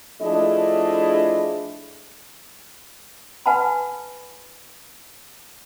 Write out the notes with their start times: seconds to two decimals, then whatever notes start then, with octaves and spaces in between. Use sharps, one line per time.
0.22 F3 A3 D4 E4 G#4 D#5
3.46 B4 F#5 G#5 A5 B5